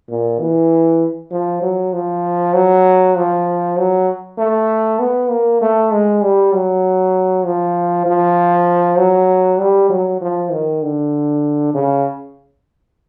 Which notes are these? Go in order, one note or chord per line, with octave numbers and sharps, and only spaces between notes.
A#2
E3
F3
F#3
F3
F#3
F3
F#3
A3
B3
A#3
A3
G#3
G3
F#3
F3
F3
F#3
G3
F#3
F3
D#3
D3
C#3